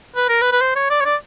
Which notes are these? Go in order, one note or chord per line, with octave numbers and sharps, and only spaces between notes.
B4
A#4
B4
B4
C5
C#5
D5
C#5
D5